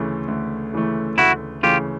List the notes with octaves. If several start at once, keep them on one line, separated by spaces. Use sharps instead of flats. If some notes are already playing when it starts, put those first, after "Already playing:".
Already playing: D2 C#3 E3 A3
D2
C#3 E3 A3
D2 E4 F#4
C#3 E3 A3 F4 G4